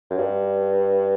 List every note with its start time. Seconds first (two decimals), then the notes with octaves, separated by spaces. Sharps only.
0.11 F#2
0.18 G2